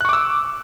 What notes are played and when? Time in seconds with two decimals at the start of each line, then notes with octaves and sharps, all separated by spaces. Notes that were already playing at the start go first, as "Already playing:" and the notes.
0.01 F#6
0.05 C#6
0.09 D6
0.13 E6